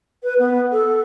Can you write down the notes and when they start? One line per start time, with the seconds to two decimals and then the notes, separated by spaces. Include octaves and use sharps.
0.23 B4
0.38 B3
0.71 A4